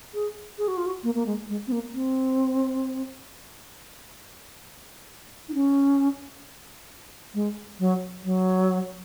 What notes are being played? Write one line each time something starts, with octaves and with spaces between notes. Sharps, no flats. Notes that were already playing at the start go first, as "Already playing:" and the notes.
G#4
G#4
F#4
F4
F#4
A#3
A#3
G#3
G#3
C4
A#3
C4
D#4
C#4
G#3
F#3
F#3